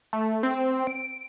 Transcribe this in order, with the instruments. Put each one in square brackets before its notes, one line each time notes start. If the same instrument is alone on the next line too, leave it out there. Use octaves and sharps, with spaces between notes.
[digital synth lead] A3
C4
D7